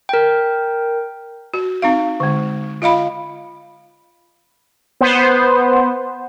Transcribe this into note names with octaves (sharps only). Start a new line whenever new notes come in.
A#4 G5
F#4
C4 D#4 F5
D3 G#3
F4 D#5 F5 B5
B3 C5